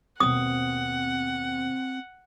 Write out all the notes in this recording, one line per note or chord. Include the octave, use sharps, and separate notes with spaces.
D#2 B2 C4 F#5 D#6